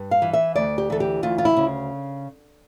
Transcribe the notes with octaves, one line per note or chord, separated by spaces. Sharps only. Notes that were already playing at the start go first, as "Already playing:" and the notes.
Already playing: G2
F5
E3
E5
D2 D5
G4
E3 A4
G4
D2 F4
F4
E4
C#3